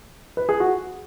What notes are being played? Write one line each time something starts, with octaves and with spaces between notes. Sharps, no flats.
B4
G#4
F#4